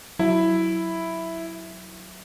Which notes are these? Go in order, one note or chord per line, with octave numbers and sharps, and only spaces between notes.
F#3 E4